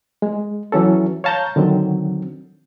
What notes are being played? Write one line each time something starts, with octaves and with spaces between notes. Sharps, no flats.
G#3
E3 F#3 C#4 A4
C#5 F5 A5 A#5 G6
D3 D#3 F#3 C4